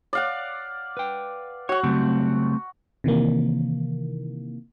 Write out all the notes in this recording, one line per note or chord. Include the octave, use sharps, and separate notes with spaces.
D5 F5 F#5
B4 G5
F#4 C#5 F#5
C#3 F#3 G3 A3 C4
C3 D#3 E3 A#3